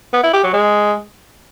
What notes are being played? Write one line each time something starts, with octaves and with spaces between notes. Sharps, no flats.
B3
E4
G4
F#3
G#3